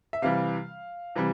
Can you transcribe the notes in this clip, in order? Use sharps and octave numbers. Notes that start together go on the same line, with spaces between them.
E5
C3 E3 G3 F5
C3 E3 G3